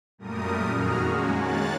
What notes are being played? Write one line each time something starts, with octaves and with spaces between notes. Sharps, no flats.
F#2 A#2 G3 A3 A#4 D#6
F2 D#3 F#4 G#4 A#5 F6
G#3 A#3 C#4 F#4
D#3 G#3 A#3 C#5 F#6 A6